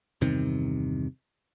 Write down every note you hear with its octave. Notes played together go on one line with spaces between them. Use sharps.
E2 G2 C3 D#3